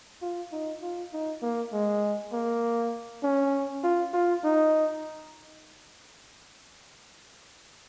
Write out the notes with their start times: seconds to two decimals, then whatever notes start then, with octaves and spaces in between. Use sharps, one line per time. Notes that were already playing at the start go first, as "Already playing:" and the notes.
0.22 F4
0.52 D#4
0.82 F4
1.13 D#4
1.42 A#3
1.73 G#3
2.33 A#3
3.23 C#4
3.84 F4
4.13 F4
4.44 D#4